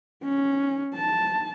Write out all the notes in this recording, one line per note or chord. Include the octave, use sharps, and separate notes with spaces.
C#4
A5